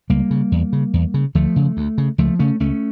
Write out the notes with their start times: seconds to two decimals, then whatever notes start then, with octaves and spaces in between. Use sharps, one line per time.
0.10 C#2 G3 A#3
0.31 C#3
0.52 E2
0.73 C#3
0.94 E2
1.14 C#3
1.35 D2 F3 A3
1.56 C#3
1.77 D2
1.98 C#3
2.18 C#2 F3 A3
2.39 C#3 A3 C#4
2.60 C#2 A3 C#4